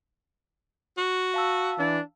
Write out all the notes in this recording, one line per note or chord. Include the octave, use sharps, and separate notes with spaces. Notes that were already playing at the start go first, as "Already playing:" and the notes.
F#4
F5 A5 E6
E3 D4